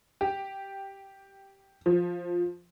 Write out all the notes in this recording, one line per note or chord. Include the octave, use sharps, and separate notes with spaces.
G4
F3